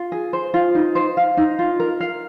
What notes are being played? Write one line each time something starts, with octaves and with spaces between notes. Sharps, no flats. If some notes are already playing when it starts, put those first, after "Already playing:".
Already playing: F4
G#4
C5
F4
D#4
C5
F5
D#4
F4
A#4
F5